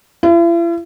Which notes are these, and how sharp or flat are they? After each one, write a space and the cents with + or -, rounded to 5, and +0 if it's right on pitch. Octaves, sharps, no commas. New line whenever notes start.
E4 +45